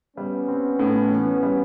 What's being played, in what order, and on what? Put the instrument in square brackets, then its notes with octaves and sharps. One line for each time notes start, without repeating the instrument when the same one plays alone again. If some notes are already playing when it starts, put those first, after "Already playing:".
[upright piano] G3 [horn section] B3 C#4
[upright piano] C4
A2
E3
G3